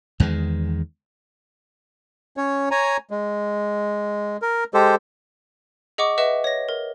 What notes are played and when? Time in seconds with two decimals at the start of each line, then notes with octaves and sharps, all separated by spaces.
0.20 E2 D#3 G#3
2.37 C#4 C#5
2.71 C#5 G#5 A#5
3.11 G#3
4.42 A#4
4.74 G#3 G4 A4 C5
5.98 G#4 D#5 F#5 C#6 D6
6.18 B4 D#5 E5 F#5 E7
6.44 C#5 A#6
6.69 A#4